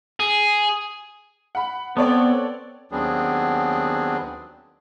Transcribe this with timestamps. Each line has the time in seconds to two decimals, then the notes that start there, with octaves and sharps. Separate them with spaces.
0.20 G#4
1.55 F#5 B5
1.97 B3 C4 A4 C#5 D5
2.92 D#2 F#3 B3 C4 D4 G#4